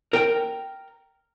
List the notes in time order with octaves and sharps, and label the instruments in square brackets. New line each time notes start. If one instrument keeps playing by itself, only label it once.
[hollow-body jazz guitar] A#4 G5